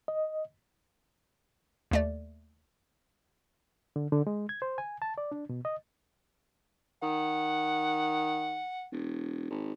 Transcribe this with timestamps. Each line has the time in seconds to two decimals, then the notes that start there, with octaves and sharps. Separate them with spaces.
0.08 D#5
1.91 D#2 A3 D5
3.96 D3
4.12 D3
4.27 G#3
4.49 G#6
4.62 C5
4.78 G#5
5.02 A5
5.18 D5
5.32 D4
5.49 B2
5.65 D#5
7.03 D#3 F#5
8.92 E1
9.50 G#1